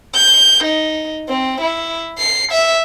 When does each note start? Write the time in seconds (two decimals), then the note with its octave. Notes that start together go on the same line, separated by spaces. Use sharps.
0.15 G6
0.64 D#4
1.29 C4
1.61 E4
2.19 C7
2.52 E5